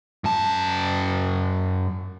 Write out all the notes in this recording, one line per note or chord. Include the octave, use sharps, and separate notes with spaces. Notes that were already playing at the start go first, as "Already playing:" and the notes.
F#2 A5